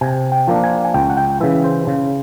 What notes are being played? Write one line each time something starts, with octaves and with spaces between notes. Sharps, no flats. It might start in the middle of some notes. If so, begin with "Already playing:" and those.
C3 G#5
G5
F3 A#3 D4
G#5
G#5
C#2 G5
F#5
G5
C#3 E3 E5
C5
C#3